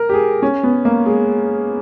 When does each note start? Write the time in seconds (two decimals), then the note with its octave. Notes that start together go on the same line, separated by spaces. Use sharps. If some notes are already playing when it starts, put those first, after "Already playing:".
Already playing: A#4
0.09 G4
0.14 G#4
0.42 C#4
0.63 B3
0.85 A#3
1.06 G#3